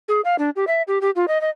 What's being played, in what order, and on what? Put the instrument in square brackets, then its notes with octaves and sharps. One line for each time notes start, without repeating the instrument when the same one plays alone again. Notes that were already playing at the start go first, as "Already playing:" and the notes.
[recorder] G#4
F5
D4
G4
E5
G4
G4
F4
D#5
D#5